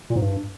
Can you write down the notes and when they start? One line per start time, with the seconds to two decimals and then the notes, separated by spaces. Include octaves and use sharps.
0.10 A#2
0.16 G#2
0.21 G2